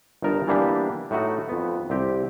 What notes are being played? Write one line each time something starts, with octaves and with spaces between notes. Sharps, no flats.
G1 G2 D#4 A#4 A5 A#5
E3 G3 A#3 B3 D4 G4
A2 A3 D#4 F#4
F2 B3
C2 C4 G4 G5